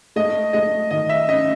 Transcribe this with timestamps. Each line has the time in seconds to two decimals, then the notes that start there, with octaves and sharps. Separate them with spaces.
0.16 A3 D#5
0.53 A3 D#5
0.91 D#3 D#5
1.09 E5
1.29 C#4 D#5